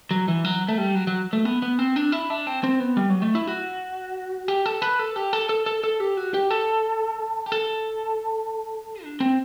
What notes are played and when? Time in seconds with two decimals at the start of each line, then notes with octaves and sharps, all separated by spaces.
0.11 F#3
0.28 E3
0.45 F#3
0.68 A3
0.78 G3
0.95 F#3
1.07 F#3
1.33 A3
1.45 B3
1.62 B3
1.79 C4
1.96 D4
2.12 E4
2.30 D4
2.47 C4
2.64 C4
2.80 B3
2.97 G3
3.10 F#3
3.22 A3
3.35 E4
3.47 F#4
4.48 G4
4.66 A4
4.82 B4
4.99 A4
5.16 G4
5.33 A4
5.49 A4
5.66 A4
5.84 A4
6.00 G4
6.17 F#4
6.34 G4
6.51 A4
7.46 G4
7.52 A4
9.04 D4
9.20 C4